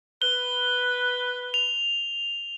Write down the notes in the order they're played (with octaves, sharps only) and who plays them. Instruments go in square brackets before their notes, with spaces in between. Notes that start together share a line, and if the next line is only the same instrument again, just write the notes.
[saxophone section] B4 [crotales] G7
[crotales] F7